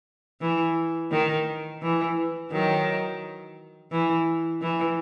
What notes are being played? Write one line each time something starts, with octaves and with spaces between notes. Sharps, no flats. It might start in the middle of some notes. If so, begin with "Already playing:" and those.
E3
D#3
E3
D#3 F#3
E3
E3